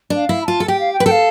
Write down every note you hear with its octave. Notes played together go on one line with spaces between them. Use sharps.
D4
F5
E4
B5
F4 A5
A4
G4 G5
F5
G5
B4
A4 G5
F5